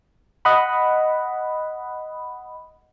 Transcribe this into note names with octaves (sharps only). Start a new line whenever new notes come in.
D#5 F#5 B5